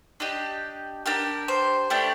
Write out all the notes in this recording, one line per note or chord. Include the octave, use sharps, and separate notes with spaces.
D4 G4 D#5
D4 G4 A#4
C5
A3 D4 G4 D5